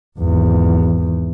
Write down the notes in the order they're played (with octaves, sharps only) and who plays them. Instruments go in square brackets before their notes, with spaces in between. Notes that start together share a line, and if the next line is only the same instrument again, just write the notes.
[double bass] G#1 E2